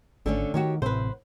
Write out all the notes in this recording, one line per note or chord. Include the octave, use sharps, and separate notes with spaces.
G#1 D3 A3 C#4
D#3 F#4 G4 C#5
A1 A2 C3 B4 C5